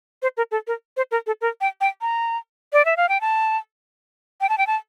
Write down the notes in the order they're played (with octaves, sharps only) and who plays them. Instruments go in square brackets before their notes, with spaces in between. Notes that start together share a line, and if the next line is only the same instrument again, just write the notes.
[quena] C5
A#4
A4
A#4
C5
A#4
A4
A#4
G5
G5
A#5
D5
E5
F5
G5
A5
G5
A5
G5
A5